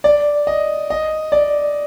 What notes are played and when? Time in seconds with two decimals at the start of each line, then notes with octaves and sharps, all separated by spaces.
0.04 D5
0.47 D#5
0.90 D#5
1.32 D5